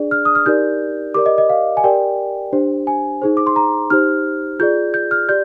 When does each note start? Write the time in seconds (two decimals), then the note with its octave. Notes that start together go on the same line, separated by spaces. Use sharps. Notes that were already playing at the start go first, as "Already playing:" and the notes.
Already playing: D4 G#4 D5
0.11 F6
0.25 D#6
0.35 F6
0.46 D#4 G4 A#4 D5 G6
1.14 G4 A#4 D5 D6
1.26 D#5
1.38 D#5
1.50 F5
1.77 G#5
1.84 G4 A#4 D5 G5
2.53 D4 G4 C5
2.87 G#5
3.22 D#4 G#4 C5
3.37 D6
3.47 C6
3.56 A#5
3.90 D#4 G4 C5 F6
4.59 F4 G#4 D5 G6
4.94 G6
5.11 F6
5.29 G4 D5 G6